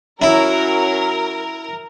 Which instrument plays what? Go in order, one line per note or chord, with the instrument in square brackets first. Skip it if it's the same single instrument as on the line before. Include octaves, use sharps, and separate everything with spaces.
[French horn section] F#3 C#4 [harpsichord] E4 [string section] A#4